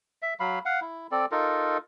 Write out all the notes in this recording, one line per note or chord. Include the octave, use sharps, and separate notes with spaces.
E5
F#3 F5 B5
F5 F#5
E4
C4 A4 D5
D#4 F4 A4 A#4